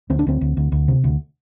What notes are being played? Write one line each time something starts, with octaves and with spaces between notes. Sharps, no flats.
D2 C4
D4
D2 C4
D2
D2
D2
C3
D2